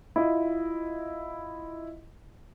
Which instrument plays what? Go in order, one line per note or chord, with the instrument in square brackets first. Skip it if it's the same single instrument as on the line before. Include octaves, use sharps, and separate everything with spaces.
[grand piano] E4 F4 D#5